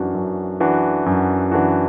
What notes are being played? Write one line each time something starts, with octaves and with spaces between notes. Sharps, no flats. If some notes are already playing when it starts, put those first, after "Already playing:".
Already playing: F#2 E3 D4 F#4
F#2
E3 D4 F#4
F#2
E3 D4 F#4